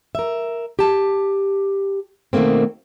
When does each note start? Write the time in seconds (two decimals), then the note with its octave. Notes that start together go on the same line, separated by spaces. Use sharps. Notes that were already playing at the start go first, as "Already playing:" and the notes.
0.15 A#4 E5
0.79 G4 A5
2.33 B2 D#3 A3 A#3 C4